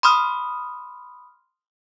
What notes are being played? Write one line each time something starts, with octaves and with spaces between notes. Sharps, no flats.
B5 C6 D#6 F6